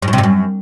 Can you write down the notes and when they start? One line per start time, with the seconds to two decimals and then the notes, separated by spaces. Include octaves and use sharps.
0.02 G2
0.08 F#2
0.13 C3
0.18 G2
0.23 F#2